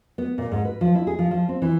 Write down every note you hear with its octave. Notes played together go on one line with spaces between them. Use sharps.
B3
A#2
G#2
B4
F3
E4
G#4
F3
F3
C4
E3